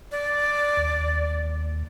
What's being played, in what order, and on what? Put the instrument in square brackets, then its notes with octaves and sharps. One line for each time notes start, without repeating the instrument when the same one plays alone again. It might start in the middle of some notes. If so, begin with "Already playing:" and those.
[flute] D5
[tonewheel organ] D#2